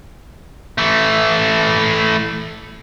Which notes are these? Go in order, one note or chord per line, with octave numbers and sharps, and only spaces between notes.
E3 A3